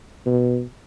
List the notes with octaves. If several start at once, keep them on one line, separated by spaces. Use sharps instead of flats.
B2